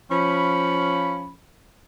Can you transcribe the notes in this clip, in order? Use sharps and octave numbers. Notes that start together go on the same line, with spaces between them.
F3 C#4 B5